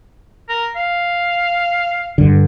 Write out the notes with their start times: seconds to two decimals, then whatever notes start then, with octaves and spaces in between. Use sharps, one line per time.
0.49 A#4
0.76 F5
2.18 G2 D3